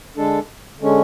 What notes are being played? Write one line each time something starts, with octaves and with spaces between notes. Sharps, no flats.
D3 G#3 D4 A4
D3 G#3 C#4